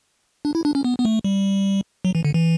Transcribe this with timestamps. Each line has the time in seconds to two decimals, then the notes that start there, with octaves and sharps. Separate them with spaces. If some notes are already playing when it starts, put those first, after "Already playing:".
0.45 D4
0.55 E4
0.65 D4
0.75 C#4
0.84 B3
0.99 B3
1.05 A3
1.24 G3
2.05 F#3
2.15 E3
2.25 D3
2.34 E3